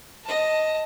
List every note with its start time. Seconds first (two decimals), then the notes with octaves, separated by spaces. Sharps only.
0.23 D#5 A5